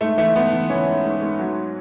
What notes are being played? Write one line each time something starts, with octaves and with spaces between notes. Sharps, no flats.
G#2 A3
E3 A3
G#2 B3
E3
E3 C#4
G#2
G#2
G#2
F#3